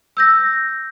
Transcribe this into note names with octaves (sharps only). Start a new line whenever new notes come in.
E6 G6 A#6